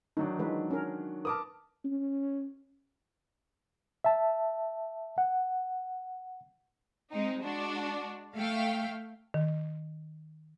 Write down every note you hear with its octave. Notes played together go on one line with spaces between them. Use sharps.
D#3 F#3 D4 D#4
E3 G#3 B4
C#4 A#4
A#4 B4 A5 D6 D#6
C#4
E5 A5
F#5
G#3 C4 D#4
G#3 D4 F#4
A3 F5 G5
D#3